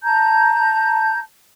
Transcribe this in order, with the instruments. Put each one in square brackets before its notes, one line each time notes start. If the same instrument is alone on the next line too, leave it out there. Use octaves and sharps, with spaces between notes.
[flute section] A5 A#5 G6